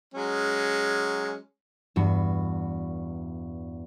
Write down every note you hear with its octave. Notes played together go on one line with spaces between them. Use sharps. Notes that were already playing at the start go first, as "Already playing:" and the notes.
F#3 G#3 C#4
E2 G2 F#4